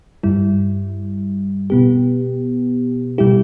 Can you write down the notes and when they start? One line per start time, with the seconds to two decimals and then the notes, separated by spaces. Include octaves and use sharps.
0.23 G2 G3 E4
1.70 B2 B3 G4
3.18 B2 G3 E4 G4